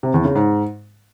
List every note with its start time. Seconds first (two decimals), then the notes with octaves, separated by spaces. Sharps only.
0.03 C3
0.14 E2
0.25 C#3
0.35 G#2